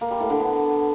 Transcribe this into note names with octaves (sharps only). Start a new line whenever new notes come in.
A#3
G3
A2
D3
B3